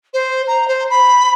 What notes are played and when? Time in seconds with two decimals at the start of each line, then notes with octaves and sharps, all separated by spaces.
0.13 C5
0.47 A#5
0.68 C5
0.90 B5